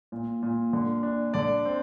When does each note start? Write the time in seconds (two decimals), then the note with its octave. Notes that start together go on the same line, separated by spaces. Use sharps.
0.12 A#2
0.43 A#2
0.73 D3
1.03 D4
1.34 D3 D5
1.65 C4